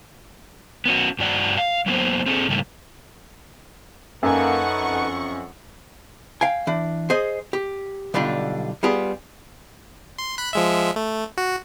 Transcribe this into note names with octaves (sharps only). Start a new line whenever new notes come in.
B3 C#4 F#4
G2 F#4 D5 F#5
F5
F#3 A#3 B3 C5
C4 G#4 A4
G#2 C#3 G3 A3 A#3
F#2 A#3 D#4 A4 B4 F#5 G#5 C#6
F2
F5 G5 G#5
E3 D4
G#4 C5 D#5
G4
B1 D3 G3 D4 F4
G3 B3 F4 G4 G#4
C6
B5 F#6
F3 G#3 E5
A3
F#4